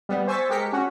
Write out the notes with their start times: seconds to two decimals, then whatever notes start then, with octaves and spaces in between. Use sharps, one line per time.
0.09 G3 B3
0.27 C5 G#5 C#6 E6 A6 B6
0.49 G#3 G4 A#4 B6 C#7
0.73 C#4 F#4